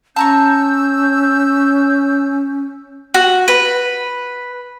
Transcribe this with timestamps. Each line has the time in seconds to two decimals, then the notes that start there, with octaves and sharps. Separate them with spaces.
0.16 C#4 A5 A#5 C#6 E6 G6
3.14 F#4
3.48 B4